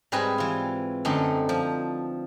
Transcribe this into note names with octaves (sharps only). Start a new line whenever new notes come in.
G#2 G3 C4 B4 D#5 G#5
E3 F4
F#2 D3 A3 C4 D#4
F3